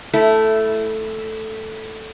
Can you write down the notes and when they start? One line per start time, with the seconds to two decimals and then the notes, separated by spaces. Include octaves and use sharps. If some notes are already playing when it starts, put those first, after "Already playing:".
0.13 A3 E4